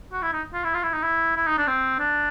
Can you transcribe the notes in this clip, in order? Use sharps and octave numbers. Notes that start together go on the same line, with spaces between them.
F#4
E4
D#4
F4
E4
F4
E4
D#4
E4
E4
D#4
D4
C4
D4